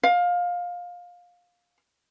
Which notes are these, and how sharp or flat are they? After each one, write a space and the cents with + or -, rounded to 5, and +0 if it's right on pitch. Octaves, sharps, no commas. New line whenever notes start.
F5 +20